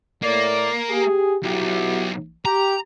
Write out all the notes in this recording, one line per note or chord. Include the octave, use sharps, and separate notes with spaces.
A2 A#3 D5
G4 G#4
B1 E4 F#4 G4
G4 A#5